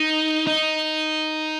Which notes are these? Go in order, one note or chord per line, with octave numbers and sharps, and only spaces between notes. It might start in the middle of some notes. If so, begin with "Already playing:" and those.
Already playing: D#4
D#4